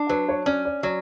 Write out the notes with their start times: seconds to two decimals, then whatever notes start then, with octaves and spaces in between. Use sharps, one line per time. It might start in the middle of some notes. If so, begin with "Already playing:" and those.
Already playing: D4
0.09 F#3 B4
0.29 C#5
0.46 C#4 D5
0.65 D5
0.83 F#3 D5